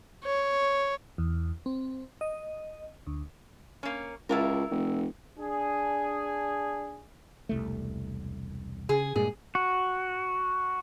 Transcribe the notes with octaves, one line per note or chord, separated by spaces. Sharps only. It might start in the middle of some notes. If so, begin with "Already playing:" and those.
C#5
E2
C4
D#5
D2
A#3 C#4
C#2 E4 F4 A#4
F1
D4 G#4
E1 C2 A3
C#3 G#4
G2 A#2 G#3 G#4
F#4